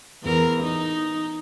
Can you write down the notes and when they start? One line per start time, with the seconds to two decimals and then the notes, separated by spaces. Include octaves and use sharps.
0.23 E2 A#4
0.63 D#4